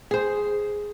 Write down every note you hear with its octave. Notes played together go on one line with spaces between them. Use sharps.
G#4 C5